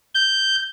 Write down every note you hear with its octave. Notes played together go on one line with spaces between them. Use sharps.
G6